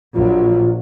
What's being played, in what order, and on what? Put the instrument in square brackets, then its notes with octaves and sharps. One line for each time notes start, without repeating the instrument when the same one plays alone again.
[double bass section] A#1 F#3 [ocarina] F4